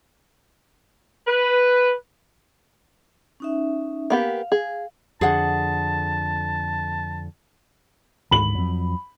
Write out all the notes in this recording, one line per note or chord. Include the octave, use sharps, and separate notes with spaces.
B4
C#4 D#4 E5
A#3 B3 G4 F5
G#4
F2 D3 G#4 F#5 A5
D2 G#2 D#3 B5 F#7
F2 F#3